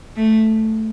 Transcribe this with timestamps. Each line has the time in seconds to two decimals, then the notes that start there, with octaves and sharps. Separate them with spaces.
0.16 A3